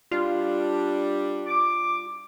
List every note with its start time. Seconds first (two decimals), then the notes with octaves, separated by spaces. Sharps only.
0.11 G3 D4 F4
1.47 D6